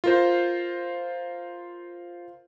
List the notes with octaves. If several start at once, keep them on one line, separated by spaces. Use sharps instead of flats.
F4 A#4 C5